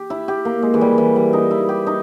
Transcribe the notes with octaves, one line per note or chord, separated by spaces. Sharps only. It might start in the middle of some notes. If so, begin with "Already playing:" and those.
Already playing: G4
E4
G4
A#3
G#3
E3
G3
E3
G3
D#4
E4
G4
D#4